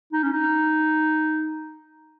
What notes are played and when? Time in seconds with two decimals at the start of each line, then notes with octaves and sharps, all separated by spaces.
0.13 D#4
0.23 C#4
0.32 D#4